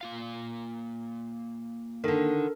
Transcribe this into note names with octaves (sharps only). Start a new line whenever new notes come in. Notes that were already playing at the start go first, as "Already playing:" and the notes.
A#3 F4 F5
D3 D#3 A4 A#4